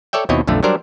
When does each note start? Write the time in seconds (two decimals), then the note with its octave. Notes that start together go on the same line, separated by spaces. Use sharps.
0.13 A4 C#5 D5 E5 G5
0.29 D#2 B2 C4 E4 C#5 D#5
0.47 B1 F2 D3 A3
0.63 F#3 G3 D4 A#4 C5 D5